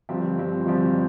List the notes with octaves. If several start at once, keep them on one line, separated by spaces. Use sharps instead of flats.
G1 G2 F3 C4
G1 G2 F3 C4
G1 G2 F3 C4